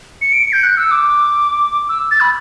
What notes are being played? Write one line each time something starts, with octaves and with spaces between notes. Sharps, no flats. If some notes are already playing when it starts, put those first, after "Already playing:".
C#7
D7
C#7
G6
F#6
E6
D6
E6
A6
B5